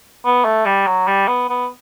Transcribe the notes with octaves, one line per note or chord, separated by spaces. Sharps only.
B3
A3
G3
F#3
G3
B3
B3